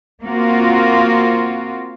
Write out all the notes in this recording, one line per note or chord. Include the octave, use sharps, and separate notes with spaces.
A#3 C4 F4 F#4